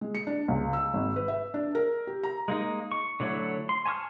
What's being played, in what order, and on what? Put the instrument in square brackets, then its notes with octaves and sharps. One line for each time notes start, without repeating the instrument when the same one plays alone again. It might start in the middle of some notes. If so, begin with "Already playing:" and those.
[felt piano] G#3
C#7
D4
C#2
E6
G#1
B4
E5
D4
A#4
G4
A#5
[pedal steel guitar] G#3 A#3 D#4
C#6
D3 F#3 A3 E4 C#5
C6
G#5 A5 C#6 D#6 F6